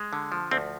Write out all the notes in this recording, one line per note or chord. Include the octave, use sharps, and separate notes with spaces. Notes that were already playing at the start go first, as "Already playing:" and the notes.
Already playing: G#3
D3
F3
D2 C4